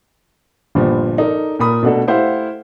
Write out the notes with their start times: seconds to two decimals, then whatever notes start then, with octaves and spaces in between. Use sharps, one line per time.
0.75 G1 G2 A#2 F3
1.18 D#4 A4 A#4 D5
1.59 A#2 A#4 B5 D#6
1.83 B2 A3 D4 F#4 A4
2.07 A3 E4 G4 C5 F5 F#5